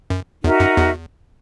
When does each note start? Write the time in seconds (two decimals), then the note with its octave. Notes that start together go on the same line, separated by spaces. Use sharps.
0.10 F#2
0.43 E2 D#4 F#4 A#4 E5
0.60 F#2
0.77 E2